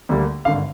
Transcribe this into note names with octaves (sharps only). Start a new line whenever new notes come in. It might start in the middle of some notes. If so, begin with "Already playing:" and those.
D2 D3 G3 A#3
G#1 G2 D3 F5